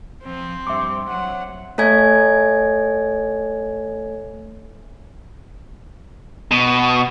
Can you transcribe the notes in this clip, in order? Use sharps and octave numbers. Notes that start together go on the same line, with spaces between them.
F3 C4
G2 E5 C6 D6
F#3 F#5
A3 A4 C#5 E5 G#5 G#6
B2